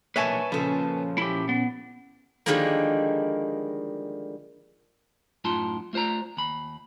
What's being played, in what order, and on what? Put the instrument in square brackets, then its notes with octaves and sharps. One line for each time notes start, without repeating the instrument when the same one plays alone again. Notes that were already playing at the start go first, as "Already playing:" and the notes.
[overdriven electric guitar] B1 A#3 [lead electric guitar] B4 A5 [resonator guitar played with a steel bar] C#5 E5 G#5 [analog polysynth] C#6
[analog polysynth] A#2 C#4 [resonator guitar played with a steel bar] C#3 A4 [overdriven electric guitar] F3
[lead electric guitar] E4 G4
B3
[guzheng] D3 D#3 F3 G3 G#3 A#3
[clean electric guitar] F#2 A2 D#4 F4 A5 C6
A3 F4 C5 D5 A#5
D#2 B5